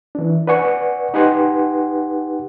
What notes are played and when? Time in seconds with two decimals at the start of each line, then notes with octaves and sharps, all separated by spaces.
0.15 E3 D4
0.47 B4 D5 F#5 G#5 C#6
1.14 D#4 G4 B4 F#5 G#5 C6